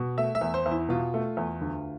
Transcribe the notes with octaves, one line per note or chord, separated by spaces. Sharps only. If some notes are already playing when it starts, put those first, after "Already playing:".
Already playing: B2
A3 E5
E5
E2
C5
E2
E4
B2 F4
A3
E2
D2